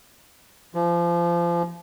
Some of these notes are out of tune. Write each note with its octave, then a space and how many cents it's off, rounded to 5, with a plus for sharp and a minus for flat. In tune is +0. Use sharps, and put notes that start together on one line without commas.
F3 -30